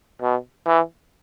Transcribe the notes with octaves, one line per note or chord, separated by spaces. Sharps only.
B2
E3